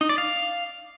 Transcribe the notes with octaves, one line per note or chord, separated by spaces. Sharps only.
D#4
D5
F5